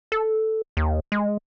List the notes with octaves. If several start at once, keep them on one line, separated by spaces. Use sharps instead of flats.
A4
D#2
G#3